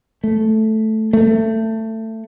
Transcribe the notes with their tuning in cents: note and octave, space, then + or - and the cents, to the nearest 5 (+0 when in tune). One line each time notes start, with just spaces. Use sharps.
A3 -5
A3 +20